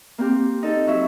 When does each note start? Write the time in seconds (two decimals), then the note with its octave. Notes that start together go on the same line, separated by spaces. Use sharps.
0.18 A#3 C4 G4
0.63 D#4 A4
0.87 F#3 E5